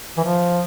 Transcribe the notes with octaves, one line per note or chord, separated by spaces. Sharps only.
E3
F3